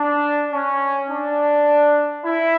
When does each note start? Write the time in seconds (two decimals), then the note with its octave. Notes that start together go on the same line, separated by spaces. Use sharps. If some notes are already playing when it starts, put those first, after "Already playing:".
Already playing: D4
0.52 C#4
1.10 D4
2.25 E4